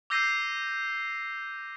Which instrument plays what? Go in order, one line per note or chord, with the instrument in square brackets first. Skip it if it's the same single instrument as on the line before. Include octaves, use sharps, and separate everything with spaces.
[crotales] D6 E6 G6 A#6 C7 D#7